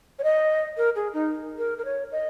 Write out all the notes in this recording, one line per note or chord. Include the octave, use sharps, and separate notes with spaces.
C#5
D#5
A#4
G#4
D#4
A#4
A#4
C#5
D#5